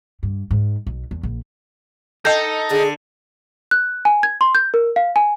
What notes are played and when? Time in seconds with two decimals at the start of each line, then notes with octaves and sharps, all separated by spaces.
0.23 G2
0.51 G#2
0.87 B1
1.11 E2
1.23 A#1
2.25 D#4 A4 D#5 G5 G6
2.71 D3 G#4
3.71 F#6
4.05 G#5
4.23 G#6
4.41 C6
4.55 G6
4.74 A#4
4.96 F5
5.16 G#5